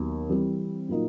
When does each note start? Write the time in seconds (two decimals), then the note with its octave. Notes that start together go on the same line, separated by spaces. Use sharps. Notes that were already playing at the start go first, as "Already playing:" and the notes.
Already playing: D#2 D#3 F#3 B3
0.29 E3 G3 C4
0.89 A#2 F#3 A#3 D#4